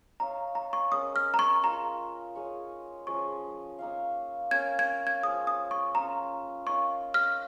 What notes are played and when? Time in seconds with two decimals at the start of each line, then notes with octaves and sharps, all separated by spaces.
0.20 D#4 C#5 F5 A#5
0.55 A#5
0.73 C#6
0.92 G#3 C#4 A#4 D#5 D#6
1.16 F6
1.34 A#5
1.39 C#6
1.64 G#3 F4 A#4 A#5
2.35 G#3 D#4 G#4 C#5
3.07 F3 G#3 C#4 C#6
3.79 A#3 D#4 C#5 F5
4.51 C#4 A#4 F5 G#6
4.79 G#6
5.07 G#6
5.23 F3 C#4 G#4 D#6
5.47 D#6
5.71 C#6
5.95 A#3 C#4 F4 C#5 A#5
6.66 D#4 A#4 C#5 F5 C#6
7.14 F6